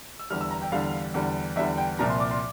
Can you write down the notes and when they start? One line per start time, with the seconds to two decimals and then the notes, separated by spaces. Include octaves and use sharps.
0.19 E6
0.30 E2 D3 G3 F6
0.41 E6
0.51 A#5
0.62 G5
0.72 E2 D3 G3 F5
1.14 E2 D3 G3
1.56 E2 D3 G3 E5
1.78 G5
1.99 C2 A#2 F3 A#5
2.10 C6
2.20 D6
2.31 C6